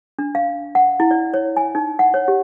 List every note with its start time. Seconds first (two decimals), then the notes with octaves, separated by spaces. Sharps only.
0.19 D4
0.35 F5
0.75 F#5
1.00 E4
1.11 D5
1.34 C#5
1.57 G#5
1.75 D#4
1.99 F#5
2.14 C#5
2.28 G4